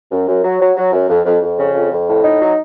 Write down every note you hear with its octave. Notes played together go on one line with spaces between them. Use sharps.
F#2
F#2
F#3
F#3
F#3
F#2
F2
F2
F2
C#3
F2
F2
A2
D#4
F#3